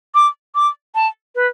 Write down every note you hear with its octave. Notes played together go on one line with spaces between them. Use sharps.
D6
D6
A5
B4